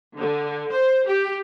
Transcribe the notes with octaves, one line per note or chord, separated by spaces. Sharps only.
D3
C5
G4